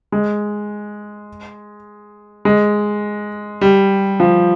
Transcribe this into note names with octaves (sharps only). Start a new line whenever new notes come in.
G#3
G#3
G3
F3